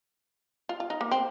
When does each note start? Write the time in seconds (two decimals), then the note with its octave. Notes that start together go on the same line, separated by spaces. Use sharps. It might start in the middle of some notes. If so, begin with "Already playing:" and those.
0.69 F4
0.80 F4
0.90 D#4
1.01 A#3
1.11 C4